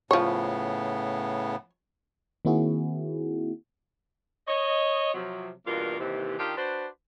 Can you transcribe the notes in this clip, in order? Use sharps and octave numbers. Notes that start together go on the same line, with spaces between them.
A2 C#3 F3 B3 C#5
D#3 A#3 C4 E4 F#4 G#4
C#5 D#5
C3 F3 F#3
E2 G2 B2 A#3 F4 A#4
D#2 C3 E3
D#3 D4 D#4 F4 G4
D4 F#4 B4 C5